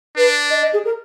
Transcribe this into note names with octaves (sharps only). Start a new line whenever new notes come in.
D4 B4
D#5
D#5
G#4
A#4